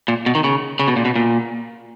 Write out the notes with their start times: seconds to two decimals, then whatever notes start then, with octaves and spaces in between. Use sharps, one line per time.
0.08 A#2
0.26 B2
0.35 D#3
0.44 C#3
0.79 C#3
0.88 B2
0.96 A#2
1.05 B2
1.16 A#2